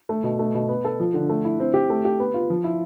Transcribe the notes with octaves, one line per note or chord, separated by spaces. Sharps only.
A3
B2
A3
B2
B3
A4
F3
D3
A3
E4
C4
G4
A3
G4
B3
F4
F3
E4